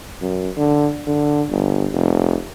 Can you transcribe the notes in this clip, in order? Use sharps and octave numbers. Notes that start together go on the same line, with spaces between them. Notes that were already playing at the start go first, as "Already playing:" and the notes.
F#2
D3
D3
G1
F1